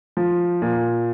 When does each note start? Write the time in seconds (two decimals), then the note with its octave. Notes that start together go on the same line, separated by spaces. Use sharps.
0.17 F3
0.62 A#2